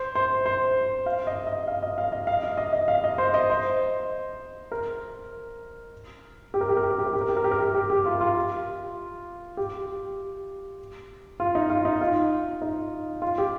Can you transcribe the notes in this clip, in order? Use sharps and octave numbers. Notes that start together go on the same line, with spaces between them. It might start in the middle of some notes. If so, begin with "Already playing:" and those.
Already playing: C5
C5
C5
F5
D#5
D#5
F5
D#5
F5
D#5
F5
D#5
D#5
D#5
F5
D#5
C5
D#5
C5
A#4
G4
A#4
G4
A#4
G4
A#4
G4
A#4
G4
A#4
G4
A#4
G4
A#4
G4
G4
G4
F4
F4
G4
F4
D#4
F4
D#4
F4
D#4
F4
G4